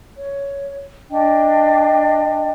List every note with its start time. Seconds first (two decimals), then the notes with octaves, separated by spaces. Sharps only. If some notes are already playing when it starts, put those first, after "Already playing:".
0.15 C#5
1.09 D4 D#5 G5